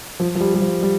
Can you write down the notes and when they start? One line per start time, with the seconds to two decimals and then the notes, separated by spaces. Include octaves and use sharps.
0.20 F3
0.35 F3
0.41 G3
0.54 G3
0.61 F3
0.83 G3